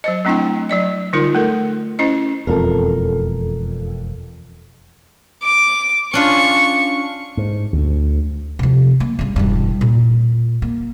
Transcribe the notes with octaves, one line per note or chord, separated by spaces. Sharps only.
F#3 C5 D#5
F#3 A3 C4 D4 E4 G5
F#3 D5 D#5
D3 G3 D#4 F4 A#4
A3 A4 A#4
C#4 E4 C5 D#5
E1 F2 A4 A#4
D6
C#4 D4 F4 C#6
G#2
D2
C3 F3
A#3
G2 C#3
E1 G2
A#2
A#3